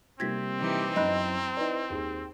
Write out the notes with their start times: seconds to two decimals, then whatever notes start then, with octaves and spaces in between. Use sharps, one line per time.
0.20 C3 G3 A#3 C4 G#6 A#6 B6
0.58 E3 D#4 G4
0.96 F#2 E4 D#5 A#5 B5 F#6
1.57 E4 B4 D5 D#5
1.90 D#2 G#4